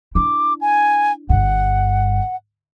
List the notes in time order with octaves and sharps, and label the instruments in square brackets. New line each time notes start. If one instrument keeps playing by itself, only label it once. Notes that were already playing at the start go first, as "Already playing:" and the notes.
[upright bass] D4 E4 [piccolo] D6
[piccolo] G#5
[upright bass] G1 G2 [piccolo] F#5